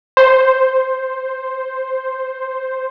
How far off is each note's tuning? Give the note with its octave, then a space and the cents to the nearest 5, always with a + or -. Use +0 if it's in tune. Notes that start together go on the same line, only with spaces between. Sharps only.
C5 +0